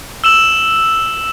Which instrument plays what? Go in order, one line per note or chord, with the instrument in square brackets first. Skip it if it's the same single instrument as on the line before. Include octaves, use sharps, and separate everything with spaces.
[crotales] E6 E7 F#7